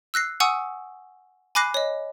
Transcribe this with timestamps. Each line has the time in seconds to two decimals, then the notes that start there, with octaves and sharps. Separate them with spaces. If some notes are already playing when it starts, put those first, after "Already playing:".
0.14 E6 F#6 A#6 C7
0.40 F#5 G#5 C#6 D#6 E6
1.55 G#5 B5 D6 F#6 A#6 C7
1.74 C#5 D#5